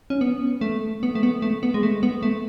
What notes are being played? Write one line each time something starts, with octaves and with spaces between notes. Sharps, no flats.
C#4
B3
A3
B3
A3
B3
A3
B3
G#3
A3
B3
A3